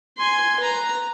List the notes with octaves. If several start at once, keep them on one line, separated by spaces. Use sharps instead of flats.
G#5 C6
B4 A#5